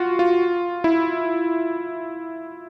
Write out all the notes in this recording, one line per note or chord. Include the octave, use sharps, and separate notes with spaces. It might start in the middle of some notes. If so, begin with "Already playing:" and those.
Already playing: F4 F#4
F4
E4